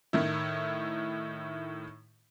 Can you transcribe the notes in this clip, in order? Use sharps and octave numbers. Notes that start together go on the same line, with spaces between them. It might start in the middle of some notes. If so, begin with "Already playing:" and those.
A2 D#3 E4